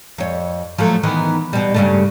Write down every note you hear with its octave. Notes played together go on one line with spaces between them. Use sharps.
F2 C#5
F3 F#3 A3
D#3 E3 B3
B2 G3
G2 C#3 A3